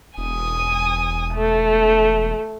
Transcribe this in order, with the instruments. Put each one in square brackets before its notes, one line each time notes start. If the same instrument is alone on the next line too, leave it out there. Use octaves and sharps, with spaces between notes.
[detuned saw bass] E1 [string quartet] G#5 D#6
[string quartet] A3